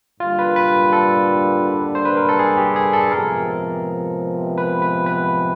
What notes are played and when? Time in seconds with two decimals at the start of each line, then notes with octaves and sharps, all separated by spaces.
0.20 G2 D3 G3 A#3 F4
0.39 B4
0.56 B4
0.93 A4
1.95 C5
2.05 B4
2.17 A#4
2.29 A4
2.39 G#4
2.57 G4
2.76 G#4
2.93 A4
3.11 C3 F3 G#3 B3 A#4
4.58 B4
4.82 B4
5.06 B4